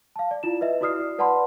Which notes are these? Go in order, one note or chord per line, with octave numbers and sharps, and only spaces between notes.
F5 A5
D5
E4 F4 E7
B4 D#5 E5
E4 F#4 D5 D#6 F6 C7
B4 D5 F#5 A5 B5 C6